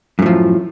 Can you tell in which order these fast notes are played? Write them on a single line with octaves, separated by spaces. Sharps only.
F#2 A2 F3